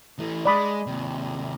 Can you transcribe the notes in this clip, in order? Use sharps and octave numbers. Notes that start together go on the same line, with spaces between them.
E3 A3
G#3 D5 B5 D#6
D#2 C3